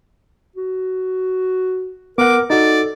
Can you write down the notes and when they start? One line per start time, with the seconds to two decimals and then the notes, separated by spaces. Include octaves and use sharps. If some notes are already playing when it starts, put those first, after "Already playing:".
0.56 F#4
2.18 B3 A#4 F#5 D6
2.50 D#4 F#4 A4 D5